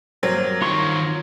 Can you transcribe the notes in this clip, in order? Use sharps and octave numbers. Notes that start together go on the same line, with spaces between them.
G2 F#3 A#3 C4
D#3 F4 C#5 C6 C#6